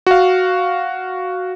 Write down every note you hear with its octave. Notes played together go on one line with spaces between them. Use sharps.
F#4 F5